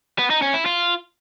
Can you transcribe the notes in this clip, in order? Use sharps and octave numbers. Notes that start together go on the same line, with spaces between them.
B3
D#4
C#4
E4
F4